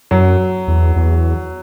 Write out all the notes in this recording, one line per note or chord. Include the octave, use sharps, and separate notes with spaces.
F#2 F#3
E2
E2